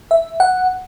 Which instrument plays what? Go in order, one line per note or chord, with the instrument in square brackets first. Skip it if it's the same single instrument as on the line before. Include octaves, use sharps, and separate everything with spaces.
[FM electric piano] E5
F#5